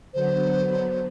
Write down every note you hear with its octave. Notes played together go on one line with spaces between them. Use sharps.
D3 F#3 B3 C5